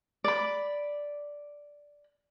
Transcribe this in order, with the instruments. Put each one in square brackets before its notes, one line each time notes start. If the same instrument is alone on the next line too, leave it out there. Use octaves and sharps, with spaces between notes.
[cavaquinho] D5 B5